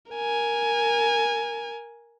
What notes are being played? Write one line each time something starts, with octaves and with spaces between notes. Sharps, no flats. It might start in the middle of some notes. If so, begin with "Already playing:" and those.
A#4 G#5